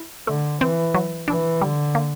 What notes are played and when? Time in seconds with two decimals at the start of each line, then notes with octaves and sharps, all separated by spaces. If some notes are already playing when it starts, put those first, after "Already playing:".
Already playing: E4
0.27 D3 A3
0.61 E3 C4
0.94 F#3
1.28 E3 D4
1.61 D3 G3
1.95 A#3